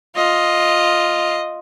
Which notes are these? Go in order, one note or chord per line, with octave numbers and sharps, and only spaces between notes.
F4 D#5